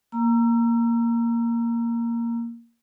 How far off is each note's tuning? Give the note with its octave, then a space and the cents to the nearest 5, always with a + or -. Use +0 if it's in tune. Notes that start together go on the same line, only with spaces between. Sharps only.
A#3 +0 A#5 +0 E6 +30